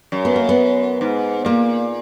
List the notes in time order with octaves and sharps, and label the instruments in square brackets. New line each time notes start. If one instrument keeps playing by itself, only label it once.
[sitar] F#2
[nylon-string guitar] B3
A#3
B3
[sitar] G#2
[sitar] A#2 [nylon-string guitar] A#3